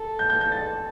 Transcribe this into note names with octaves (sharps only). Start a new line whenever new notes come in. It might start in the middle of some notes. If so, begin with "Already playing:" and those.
Already playing: A4
G6
G6
G6
A6